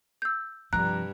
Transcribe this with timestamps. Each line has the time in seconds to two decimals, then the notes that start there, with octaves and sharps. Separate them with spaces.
0.22 E6 G6
0.73 G2 C3 F3 A#5 F#6